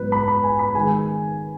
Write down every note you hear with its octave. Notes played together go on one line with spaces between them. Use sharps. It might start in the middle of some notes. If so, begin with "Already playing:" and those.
Already playing: G#2 F#3 B3 B4
B5
B5
G#5
B5
D#3 G#3 G#5